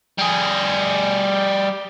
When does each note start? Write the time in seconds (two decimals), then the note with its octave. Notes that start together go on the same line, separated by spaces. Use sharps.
0.19 G3 G#4